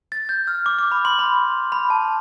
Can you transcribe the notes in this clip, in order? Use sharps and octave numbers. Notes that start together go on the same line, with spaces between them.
A6
G6
F6
D6
D6
B5
C6
B5
B5
A5